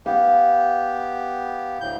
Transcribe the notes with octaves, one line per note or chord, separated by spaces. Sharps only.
B3 G4 F5
D2 A2 G6